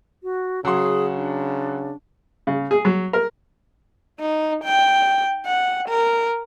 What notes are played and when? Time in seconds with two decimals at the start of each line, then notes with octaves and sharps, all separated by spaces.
0.23 F#4
0.65 C#3 F#3 G#4 F#5 C6
1.16 D4
2.47 C#3
2.71 G#4
2.85 F#3
3.13 A#4
4.20 D#4
4.64 G5
5.46 F#5
5.89 A#4